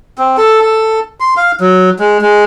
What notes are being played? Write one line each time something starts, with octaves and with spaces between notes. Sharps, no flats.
C4
A4
A4
C6
F5
F#3
G#3
G#3